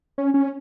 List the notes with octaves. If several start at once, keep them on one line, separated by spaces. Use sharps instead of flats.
C#4
C#4